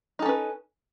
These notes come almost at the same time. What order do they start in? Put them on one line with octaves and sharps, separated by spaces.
D#4 A4 C#4 B4